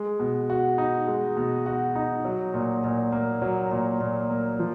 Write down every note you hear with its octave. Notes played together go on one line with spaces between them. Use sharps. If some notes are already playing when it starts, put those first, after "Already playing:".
Already playing: G#3
B2
F#4
D#4
G#3
B2
F#4
D#4
F#3
A#2
A#2
A#3
F#3
A#2
A#2
A#3
F3